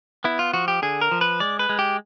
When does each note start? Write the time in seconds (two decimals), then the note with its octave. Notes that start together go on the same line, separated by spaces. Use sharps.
0.24 B3 E4
0.39 F4
0.53 F3 F#4
0.68 G4
0.82 D3 G#4
1.01 A#4
1.11 F3
1.21 B4
1.40 G#3 D5
1.59 B4
1.69 G#3
1.79 G4